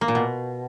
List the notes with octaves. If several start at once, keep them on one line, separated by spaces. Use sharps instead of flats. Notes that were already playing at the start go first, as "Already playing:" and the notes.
A#3
A#2
B2